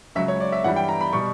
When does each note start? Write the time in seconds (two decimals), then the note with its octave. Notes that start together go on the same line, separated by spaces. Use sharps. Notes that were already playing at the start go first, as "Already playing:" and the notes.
0.15 C#2 C#3 F#3 E5
0.28 C#5
0.40 D5
0.52 E5
0.64 G2 E3 G3 F#5
0.76 G5
0.89 A#5
1.01 B5
1.13 B2 G3 C#6